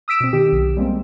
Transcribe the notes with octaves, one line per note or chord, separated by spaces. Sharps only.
D#6 E6 B6 D7 E7
B2 C4
D#3 G4
B1
G3 G#3 A#3 C4